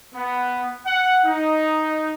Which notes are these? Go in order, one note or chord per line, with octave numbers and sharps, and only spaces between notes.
B3
F#5
D#4